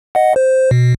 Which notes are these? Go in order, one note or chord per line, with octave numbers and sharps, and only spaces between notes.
D#5 F#5
C5
B2